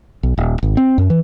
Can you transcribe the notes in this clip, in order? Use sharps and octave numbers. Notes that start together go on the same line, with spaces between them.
B1
D#1
G#1
C4
F#2
E3